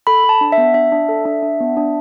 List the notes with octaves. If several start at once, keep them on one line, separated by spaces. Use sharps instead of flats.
A4 B5
A4 A5
D4
E5
B3
D4 E5
D4
A4
D4
D4
B3
D4